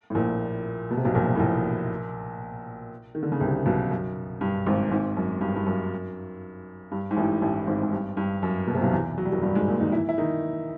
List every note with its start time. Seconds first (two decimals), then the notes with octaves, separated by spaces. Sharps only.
0.10 A2
0.15 A#1 A#2
0.91 B2
0.97 C3
1.05 B1 B2
1.15 A#1 A#2
1.36 A2
1.40 A#1 A#2
3.15 D#3
3.23 D3
3.32 C#3
3.40 C2 C3
3.66 B1 B2
3.91 F#2
4.41 G2
4.66 G#1 G#2
4.91 G#1 G#2
5.17 F#2
5.41 G2
5.56 G2
5.66 F#2
6.92 G2
7.11 G#2
7.16 A1 A2
7.42 A1 A2
7.67 G#1 G#2
7.83 G#2
7.92 G2
8.17 G2
8.43 F#2
8.67 B2
8.75 C3
8.82 B1 B2
8.92 E2 E3
9.18 F#3
9.25 G3
9.32 F#2 F#3
9.42 G2 G3
9.55 G#2 G#3
9.68 A#2 A#3
9.80 D#3 D#4
9.92 E3 E4
10.09 E4
10.18 D#3 D#4